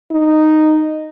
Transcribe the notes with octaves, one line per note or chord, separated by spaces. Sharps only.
D#4